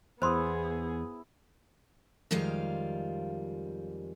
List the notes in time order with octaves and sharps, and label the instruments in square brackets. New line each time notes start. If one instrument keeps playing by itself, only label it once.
[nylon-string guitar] E2 [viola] B3 G#4 [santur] E4 D#6 [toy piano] C5 C6
[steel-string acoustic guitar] F2 D#3 G3 G#3 F4 F5